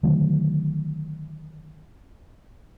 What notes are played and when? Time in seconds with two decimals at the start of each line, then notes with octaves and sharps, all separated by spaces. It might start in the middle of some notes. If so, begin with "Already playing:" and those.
0.03 D3 D#3 F#3 A3